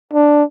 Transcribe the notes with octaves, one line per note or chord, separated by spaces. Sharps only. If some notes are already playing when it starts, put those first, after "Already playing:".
D4